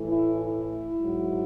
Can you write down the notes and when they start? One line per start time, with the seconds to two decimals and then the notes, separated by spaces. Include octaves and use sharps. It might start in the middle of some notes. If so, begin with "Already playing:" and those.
Already playing: A2 E3
0.09 E4
0.39 E4
1.00 G#2 F#3